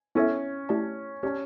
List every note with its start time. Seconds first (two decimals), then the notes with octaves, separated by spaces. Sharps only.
0.15 B3 C#4 E4 A4 C#5 E5
0.69 A3 E4 G4 D5 A5
1.23 C#4 G4 D5 A5